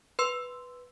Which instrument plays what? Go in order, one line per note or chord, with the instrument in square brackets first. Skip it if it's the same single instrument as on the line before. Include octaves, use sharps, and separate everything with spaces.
[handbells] B4 C6 E6